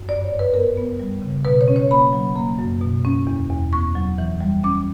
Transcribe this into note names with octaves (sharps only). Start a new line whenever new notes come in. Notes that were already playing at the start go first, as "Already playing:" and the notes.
Already playing: F#2
G2 D5
C#5
G2
B4
B3 A#4
B3
G3
C#3
B2 B4
C#5
C#4
C#5
A#3 B5
F#3
A#3
F#2
B2
C#4
E2
E2
B3 C#6
F#3
E3
G3
C#4 D6